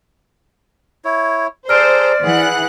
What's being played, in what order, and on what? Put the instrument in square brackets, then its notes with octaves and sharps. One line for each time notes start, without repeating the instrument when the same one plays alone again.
[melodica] E4 C#5
[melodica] G#4 A4 A#5 [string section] C5 [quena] D5 [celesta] F6 D7
[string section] E3 F#5 F#6 [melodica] G#4